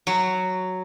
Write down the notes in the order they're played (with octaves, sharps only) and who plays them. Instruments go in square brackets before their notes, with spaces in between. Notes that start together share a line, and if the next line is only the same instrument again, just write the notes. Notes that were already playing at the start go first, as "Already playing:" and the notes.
[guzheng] F#3